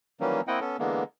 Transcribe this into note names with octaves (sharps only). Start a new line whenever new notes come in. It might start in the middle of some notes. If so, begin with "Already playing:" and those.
D#3 E3 F#3 G3 A#3 C#4
A#3 C4 E4 D#5 F#5 G5
B3 C#4 A4
D3 E3 G#3 A#3 B3